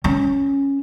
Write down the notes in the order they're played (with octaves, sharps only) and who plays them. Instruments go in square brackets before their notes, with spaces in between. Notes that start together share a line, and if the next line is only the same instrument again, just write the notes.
[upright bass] C#4